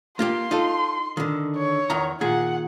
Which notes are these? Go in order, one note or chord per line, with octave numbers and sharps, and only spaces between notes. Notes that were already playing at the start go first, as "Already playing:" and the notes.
A#3 F4 G4 C6
D#4 F4 A4
D3 D#3
C#5
E2 D#3 A#5
A#2 D#3 G#4 F#5